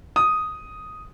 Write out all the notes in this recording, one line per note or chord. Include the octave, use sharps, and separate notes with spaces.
D#6